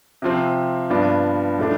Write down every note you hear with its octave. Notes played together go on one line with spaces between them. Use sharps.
C3 F3 C4
G2 F3 B3 D4
A2 F3 A3 D4